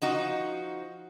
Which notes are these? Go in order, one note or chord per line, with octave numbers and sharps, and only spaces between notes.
F3 D#4 F#4